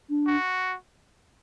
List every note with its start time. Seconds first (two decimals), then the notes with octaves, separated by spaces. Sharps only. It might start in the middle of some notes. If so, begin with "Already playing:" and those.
0.09 D4
0.26 F#4